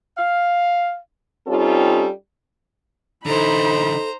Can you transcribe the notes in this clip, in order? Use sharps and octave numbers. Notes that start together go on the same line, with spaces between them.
F5
G3 C4 C#4 D#4 F4 A4
D3 E3 D#4 A4 C5 A#5 B5